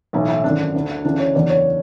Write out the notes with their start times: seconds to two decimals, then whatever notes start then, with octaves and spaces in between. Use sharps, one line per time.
0.13 B1 A2 E3 E4
0.28 E4
0.44 G#1 F#2 D3 D4
0.75 D2 D3
1.05 D2 C#3 E3 D4
1.20 C#5
1.35 F#1 E2 D3 D5
1.50 C#5